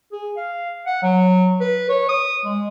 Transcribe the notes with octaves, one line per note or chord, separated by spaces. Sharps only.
G#4
F5
F#5
F#3
B4
C#5
D#6
G#3